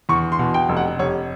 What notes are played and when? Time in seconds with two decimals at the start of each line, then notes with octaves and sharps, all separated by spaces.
0.09 E2 C#6
0.32 C6
0.39 B2
0.54 G5
0.69 F1
0.77 F#5
0.99 F1 C#5